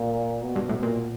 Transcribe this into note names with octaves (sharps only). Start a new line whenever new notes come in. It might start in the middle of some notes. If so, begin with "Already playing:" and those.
Already playing: A#2
B2
G2
A2
A#2